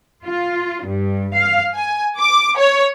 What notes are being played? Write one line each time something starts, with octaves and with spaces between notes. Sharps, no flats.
F4
G2
F5
G#5
D6
C#5